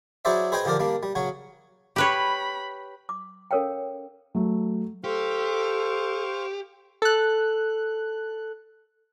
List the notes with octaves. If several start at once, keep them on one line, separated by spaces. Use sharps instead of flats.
F#3 E4 G#4 C5 D5 E5
G#4 B4 C5 D#5 G5 G#5
D3 F3 G4 A#4 D5
G3 A#3 D4
G3
C#3 F#3 F#4
G4 B4 C#5 B5
D6
C#4 A4 A#4 C#5 F5 G5
F#3 A3
G4 A4 C5 F5 C#6
A4 F#6